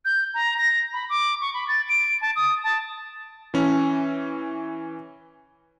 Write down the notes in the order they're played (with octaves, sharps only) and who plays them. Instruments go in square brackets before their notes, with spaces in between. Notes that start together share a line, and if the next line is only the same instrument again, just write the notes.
[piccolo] G6
A#5
A#6
B5
D6
C#6
B5
A6
D7
A5
D#6
A5
[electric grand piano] E3 C#4